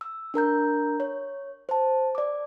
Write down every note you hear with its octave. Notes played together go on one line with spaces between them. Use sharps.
E6
D4 A#4 A#5 G6
C#5
C5 A5
D5 D6